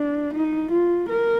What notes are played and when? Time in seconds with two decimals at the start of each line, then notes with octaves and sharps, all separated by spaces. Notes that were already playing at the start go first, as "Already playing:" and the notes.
Already playing: D4
0.33 D#4
0.71 F4
1.09 A#4